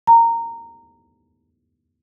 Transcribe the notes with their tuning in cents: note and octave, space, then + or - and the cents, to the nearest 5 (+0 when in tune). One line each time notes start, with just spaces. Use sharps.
A#5 -15